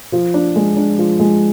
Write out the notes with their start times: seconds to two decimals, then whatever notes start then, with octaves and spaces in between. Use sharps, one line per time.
0.12 F3
0.34 D4
0.56 G#3
0.77 D4
0.98 F3
1.20 G#3